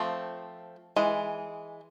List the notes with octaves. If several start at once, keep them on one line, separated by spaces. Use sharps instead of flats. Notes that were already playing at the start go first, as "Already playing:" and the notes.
Already playing: F3 A3 C4
E3 G#3